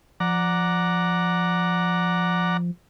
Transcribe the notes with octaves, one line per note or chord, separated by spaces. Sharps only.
F3 D5 F#5 A#5